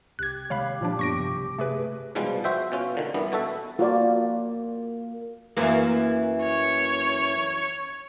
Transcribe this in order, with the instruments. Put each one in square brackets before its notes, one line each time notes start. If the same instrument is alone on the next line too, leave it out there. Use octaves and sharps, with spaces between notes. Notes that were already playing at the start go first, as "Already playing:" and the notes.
[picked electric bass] C2 [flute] G4 [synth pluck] F#6 G#6
[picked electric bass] C3 D#3 G#3 [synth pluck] C#5 F5 B5
[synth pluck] A#2 F3 D4
[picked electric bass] F#2 A#3 B3 [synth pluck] C#6 A#6 D7
[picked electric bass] B1 G2 C3
[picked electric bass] C3 [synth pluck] A3 G#4 B4
[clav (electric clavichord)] G#2 B2 F3 G3 G#3
F#4 C5 E5 G5
B2 C#4 F4
A#2 D3 D#3
G2 E3 B3
B2 F#4 A4 E5
[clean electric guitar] A#3 [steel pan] F4 F#4 D5
[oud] F#2 E3 A#3
[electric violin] C#5